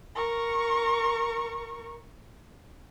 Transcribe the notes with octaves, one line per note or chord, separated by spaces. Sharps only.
A#4 C#6